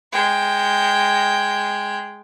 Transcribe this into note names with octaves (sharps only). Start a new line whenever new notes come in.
G#3 G5